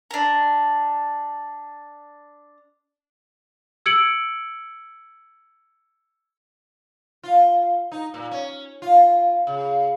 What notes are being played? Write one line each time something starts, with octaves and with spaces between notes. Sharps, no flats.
D4 A#5
E6 G#6 C#7 D7 F#7
F4
D#4
A#2
C#4
F4
C#3